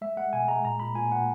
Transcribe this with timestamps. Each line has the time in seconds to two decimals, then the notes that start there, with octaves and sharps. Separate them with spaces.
0.01 G#3 E5
0.17 G#3 F#5
0.33 B2 G#5
0.48 G#3 A#5
0.65 A#2 A#5
0.80 A#2 B5
0.95 A#2 G#5
1.12 A#2 F#5